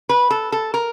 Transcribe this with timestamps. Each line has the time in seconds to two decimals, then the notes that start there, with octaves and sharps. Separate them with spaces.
0.09 B4
0.30 A4
0.52 A4
0.74 A#4